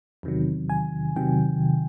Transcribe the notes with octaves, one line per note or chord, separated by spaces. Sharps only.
E2 C3 D#3 F#3
G#5
E2 C3 D#3 F#3 G5